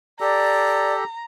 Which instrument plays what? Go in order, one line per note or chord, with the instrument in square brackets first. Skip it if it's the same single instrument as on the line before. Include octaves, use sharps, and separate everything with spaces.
[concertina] G4 A4 [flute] D5 [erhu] A#5